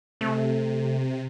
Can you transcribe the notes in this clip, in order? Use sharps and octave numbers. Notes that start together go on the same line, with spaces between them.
C3 A3